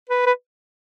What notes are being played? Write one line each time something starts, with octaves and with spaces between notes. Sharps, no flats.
B4
B4